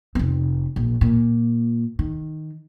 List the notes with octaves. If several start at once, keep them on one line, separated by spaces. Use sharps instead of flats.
F1 C4
A#1
A#2
D#3